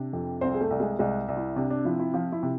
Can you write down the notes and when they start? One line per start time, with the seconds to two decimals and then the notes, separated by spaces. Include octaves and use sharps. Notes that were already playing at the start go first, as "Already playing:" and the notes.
Already playing: C3 D4
0.13 F2
0.41 C2 C4 C5
0.54 G#4
0.61 A3 A4
0.70 C2
0.80 G#3 G#4
0.99 C2 G#3 G#4
1.28 C2
1.37 E4
1.56 C3 D4
1.70 D4
1.85 F3 E4
1.99 E4
2.14 F3 F4
2.32 E4
2.43 C3